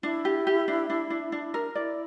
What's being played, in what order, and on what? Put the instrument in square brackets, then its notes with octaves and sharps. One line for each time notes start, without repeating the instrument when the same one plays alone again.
[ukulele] D4 [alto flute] E4
[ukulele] G4
G4
D4
D4
D4
D4
A#4
[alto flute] E4 [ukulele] D5